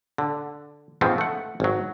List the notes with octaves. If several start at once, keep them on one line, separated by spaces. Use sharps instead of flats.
D3
G#2 C#3 F3 B3 C4
A3 F#5
G#1 F#3